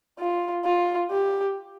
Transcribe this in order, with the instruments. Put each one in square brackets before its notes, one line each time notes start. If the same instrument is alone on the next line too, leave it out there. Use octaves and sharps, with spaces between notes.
[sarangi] F4
F4
G4